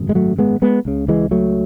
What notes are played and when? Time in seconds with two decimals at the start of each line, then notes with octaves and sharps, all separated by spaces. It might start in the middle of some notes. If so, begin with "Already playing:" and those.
Already playing: G#1 F#2 C#3
0.09 G#3
0.15 F#3 A3
0.38 G#3 B3
0.62 G#3 B3
0.85 C#2 C#3
1.08 E3 G#3
1.31 F#3 A3